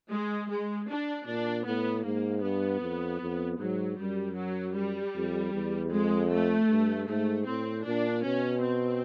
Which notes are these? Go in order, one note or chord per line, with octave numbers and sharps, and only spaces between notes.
G#3
G#3
D4
A#2 D4
A2 B3
G#2 A#3
G2 B3
F2
F2
G#2 F#3
F#2 G3
F#3
G3
F2
E2
F2 G#3
A3
G2
G#2 A3
A2 C4
A#2 D4
B2 C#4
C4